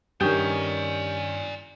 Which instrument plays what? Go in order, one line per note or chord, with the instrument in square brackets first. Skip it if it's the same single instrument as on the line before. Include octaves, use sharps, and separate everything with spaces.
[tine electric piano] G2 D#6 [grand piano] D#3 C#4 G6 [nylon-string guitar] G4 [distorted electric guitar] D5 G#5